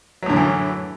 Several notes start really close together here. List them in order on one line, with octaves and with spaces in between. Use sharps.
F#3 A2 D3 F#2 E3